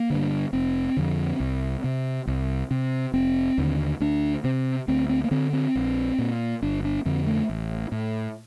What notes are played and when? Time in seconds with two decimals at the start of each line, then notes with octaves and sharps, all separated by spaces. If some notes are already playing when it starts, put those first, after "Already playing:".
Already playing: A#3
0.10 G2 D3
0.53 F1 C4
0.97 F2 D3
1.40 C2
1.84 C3
2.27 C2
2.71 C3
3.13 F1 C4
3.58 D#2 D3
4.00 D2 D4
4.44 C3 C4
4.88 D2 C4
5.09 C4
5.24 A#3
5.31 D3 C4
5.53 C4
5.75 A#1
6.18 A#2
6.62 G1 D4
6.84 D4
7.05 F2 D3 C4
7.27 A3
7.49 A1
7.92 A2